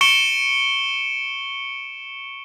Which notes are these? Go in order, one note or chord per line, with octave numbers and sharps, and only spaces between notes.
C#6 C#7 D7 E7 G7